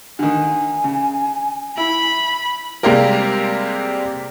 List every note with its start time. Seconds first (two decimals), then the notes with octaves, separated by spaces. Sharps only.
0.19 D3 D#3 G#5
0.84 C#3
1.77 E4 B5
2.83 C3 G3 G#3 A#3 G4 A#4